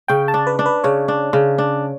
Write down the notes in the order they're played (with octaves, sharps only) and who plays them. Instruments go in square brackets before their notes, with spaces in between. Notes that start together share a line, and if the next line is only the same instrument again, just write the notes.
[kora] C#3 [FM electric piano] G5
[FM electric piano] A5
[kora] D4
[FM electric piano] B4
[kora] D4
[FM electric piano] B4
[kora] C#3 [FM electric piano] C#5
[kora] D4
C#3
D4